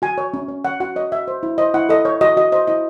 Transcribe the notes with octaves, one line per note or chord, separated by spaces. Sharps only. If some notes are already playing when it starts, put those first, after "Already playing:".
F#4 G#5
C#5
C#4
C#4
C#5 F#5
F#4 F#5
C#5 D#5
F#4 E5
C5
E4
C5 D#5
E4 F#5
A4 D#5
C#5
F#4 D#5
F#4 D#5
C5 D#5
E4 D#5